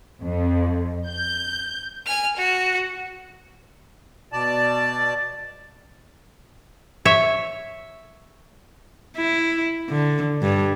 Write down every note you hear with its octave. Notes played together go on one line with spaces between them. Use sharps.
F2
G6
G#5 F6
F#4
B2 D5 A5
C#5 E5
E4
D3
G2